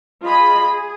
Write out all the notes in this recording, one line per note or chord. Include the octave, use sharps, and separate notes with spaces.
F4 G#4 D#5 B5
G#4